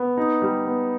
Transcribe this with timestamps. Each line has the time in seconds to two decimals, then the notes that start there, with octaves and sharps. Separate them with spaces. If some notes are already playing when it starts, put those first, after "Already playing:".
Already playing: B3
0.17 D#4
0.42 G3
0.66 B3